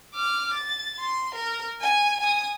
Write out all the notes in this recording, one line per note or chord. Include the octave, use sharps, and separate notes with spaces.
D6 F6
A6
C6
A#4
G#5
G#5 D#6